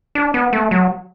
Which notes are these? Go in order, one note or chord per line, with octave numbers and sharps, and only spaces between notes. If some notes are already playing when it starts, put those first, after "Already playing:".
D4
B3
A3
F#3